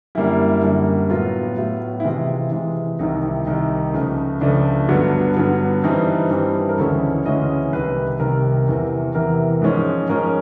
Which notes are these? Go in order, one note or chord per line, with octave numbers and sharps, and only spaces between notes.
F#2 D3 G3 A#3 E4
F#2 D3 G3 A#3
A2 F#3 B3 F4
A2 F#3 B3
E4
C3 E3 G#3 F4
C3 E3 G#3
C2 C3 D#3 D#4
E4
C2 C3 D#3 D#4
C#2 C#3 F3 A3
C#2 C#3 F3 A3 D4
G2 D3 F#3 B3
G2 D3 F#3 B3
G2 E3 G3 C4 D#4
G2 E3 G3 C4
A#4
D2 C#3 E3 G#3 C#4 A4
D2 C#3 E3 G#3 C#4 D#5
C2 C3 D#3 B4
C2 C3 D#3 A#4
E2 C3 E3
E2 C3 E3 A#4
G#2 F3 G#3 C#4
G#2 F3 G#3 C#4 A#4